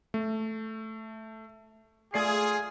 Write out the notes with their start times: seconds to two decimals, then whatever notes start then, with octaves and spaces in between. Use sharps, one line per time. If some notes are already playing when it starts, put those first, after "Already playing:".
0.14 A3
2.14 A3 F4 G#4 D5 C7